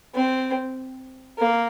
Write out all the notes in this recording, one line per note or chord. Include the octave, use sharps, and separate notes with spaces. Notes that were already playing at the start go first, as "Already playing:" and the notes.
C4
A#3